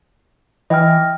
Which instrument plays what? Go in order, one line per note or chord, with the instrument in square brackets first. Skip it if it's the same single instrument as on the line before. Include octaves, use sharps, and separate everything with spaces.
[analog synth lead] E3 [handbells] D#5 G5 F6